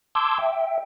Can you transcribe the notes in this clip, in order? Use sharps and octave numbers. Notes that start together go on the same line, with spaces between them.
A5 C6 D6 E6 G6 G#6
E5 G5